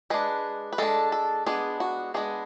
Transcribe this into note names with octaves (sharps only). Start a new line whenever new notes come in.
G#3 D4 B4
B4
G#3 D4 A4
A4
G#3 B3 D4 G#4
F#4
G#3 B3 D4 G#4